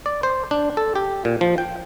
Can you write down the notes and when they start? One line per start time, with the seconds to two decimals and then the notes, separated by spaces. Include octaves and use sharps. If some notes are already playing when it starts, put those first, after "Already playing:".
0.06 D5
0.23 C5
0.51 D4
0.77 A4
0.95 G4
1.25 A#2
1.41 F3
1.58 G5